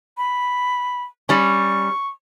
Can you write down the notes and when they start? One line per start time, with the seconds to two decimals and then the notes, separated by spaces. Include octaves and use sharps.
0.18 B5
1.29 G3 C#4 C#6